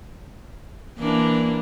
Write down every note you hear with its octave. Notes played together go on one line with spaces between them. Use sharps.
E3 A#3 D4